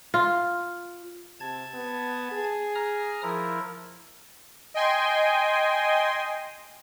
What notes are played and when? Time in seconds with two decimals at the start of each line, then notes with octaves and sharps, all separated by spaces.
0.14 F4
1.40 C3 A5 G#6
1.74 B3
2.32 G#4
2.75 A#5 D#6 F6
3.23 F3 E4 A#4
4.74 D#5 G5 G#5 C6